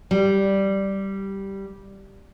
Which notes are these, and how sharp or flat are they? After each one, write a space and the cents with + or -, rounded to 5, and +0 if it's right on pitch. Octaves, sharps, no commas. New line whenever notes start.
G3 -5